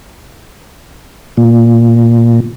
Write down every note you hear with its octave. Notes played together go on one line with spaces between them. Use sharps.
A#2